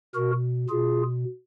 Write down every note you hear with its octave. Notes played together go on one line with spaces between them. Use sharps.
B2 F#4 A#4
B2 F4 G#4